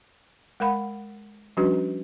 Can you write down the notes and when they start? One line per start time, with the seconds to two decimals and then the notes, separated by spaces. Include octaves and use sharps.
0.60 G#3 A#4 F5 F#5 B5
1.57 F3 G3 C#4 D4 F#4 B4